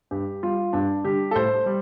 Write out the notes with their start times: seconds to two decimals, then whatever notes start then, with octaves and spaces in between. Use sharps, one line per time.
0.11 G2 G4
0.43 G3 F4
0.73 G2 D4
1.04 D3 G3 G4
1.31 A4
1.35 A2 C5
1.66 G3